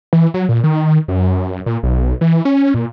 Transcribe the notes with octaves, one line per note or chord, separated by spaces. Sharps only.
E3
F#3
A#2
D#3
F#2
A#2
B1
E3
C#4
A#2